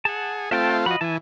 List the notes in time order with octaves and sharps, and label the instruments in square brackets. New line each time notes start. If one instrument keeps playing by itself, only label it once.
[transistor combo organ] G#4 [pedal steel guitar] F#5 A5
[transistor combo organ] A3 C4 F4 [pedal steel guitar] E5 G5 A5
[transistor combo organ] F3 F#4 [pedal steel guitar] D#5 B5
[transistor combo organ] E3 [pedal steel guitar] G#5 A5